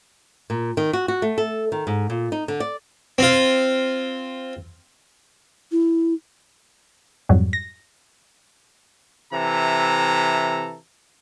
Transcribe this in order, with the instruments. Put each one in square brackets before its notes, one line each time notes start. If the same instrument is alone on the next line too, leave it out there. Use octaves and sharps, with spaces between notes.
[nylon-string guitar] A#2
D#3
F#4
F#4
A3
A4
D#3
G#2
A#2
D#4
D3
D5
[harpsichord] C4 F4
[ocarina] E4
[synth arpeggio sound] F2 G#2 F#3 G3
A#6
[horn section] C3 E3 A4 A#5